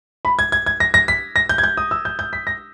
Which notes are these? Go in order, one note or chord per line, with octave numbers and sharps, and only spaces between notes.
B5
G#6
G#6
G#6
A#6
A#6
B6
A#6
G6
G#6
G6
D#6
E6
G6
G6
B6
A#6